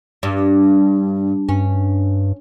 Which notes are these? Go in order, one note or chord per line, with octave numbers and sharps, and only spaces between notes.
G2
G2 C#4